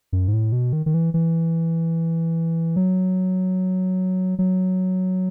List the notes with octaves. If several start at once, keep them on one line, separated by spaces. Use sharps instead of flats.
F#2
G#2
A2
B2
D#3
D#3
E3
E3
F#3
F#3